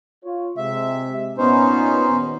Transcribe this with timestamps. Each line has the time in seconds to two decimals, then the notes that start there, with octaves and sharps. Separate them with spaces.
0.24 F4 C#5
0.57 C3 G#3 E5
1.38 A#2 B3 C#4 D#4 C5
2.09 D#2